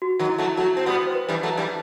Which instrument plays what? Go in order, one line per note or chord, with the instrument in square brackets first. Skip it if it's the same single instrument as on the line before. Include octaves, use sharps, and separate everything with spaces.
[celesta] F#4
[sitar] D#3 F#3
[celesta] E4
[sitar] F#3 A3
[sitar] F#3 A3 [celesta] F#4
[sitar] C4
[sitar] G3 B3 [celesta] F#4
[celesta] C5
B4
[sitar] E3 G3
F#3 A3
E3 G3